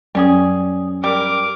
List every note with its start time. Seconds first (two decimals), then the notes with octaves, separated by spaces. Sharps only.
0.15 F#2 G3 C#4 G#4
1.04 G3 A#4 D6